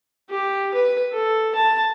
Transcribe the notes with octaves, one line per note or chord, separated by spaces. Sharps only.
G4
B4
A4
A5